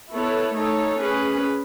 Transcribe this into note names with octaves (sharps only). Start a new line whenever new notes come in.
B3 E4 A4 C#5
A3 D#4 A4 C#5
C#4 G#4 B4